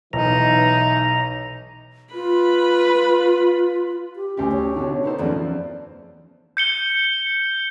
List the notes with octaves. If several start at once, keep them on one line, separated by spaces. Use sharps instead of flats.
B1 E3 D#4 A#5
F4 B4 B5
G4
D2 G3 C#4 G4
C#5
B2 D3
B3 D#4 A4 C5
E2 C#3 F3 D5
G6 C#7 G7